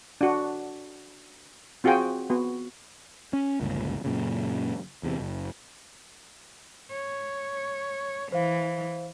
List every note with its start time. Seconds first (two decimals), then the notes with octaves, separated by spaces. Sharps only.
0.21 D4 F#4
1.84 C4 F4 F#4 G#4 G5 G#5
2.30 B3 F#4
3.33 C#4
3.61 G1 C#2 A#2
4.04 F#2 A#2 C#3
5.03 E2 C3
5.20 F#1
6.91 C#5
8.32 E3 C5 F5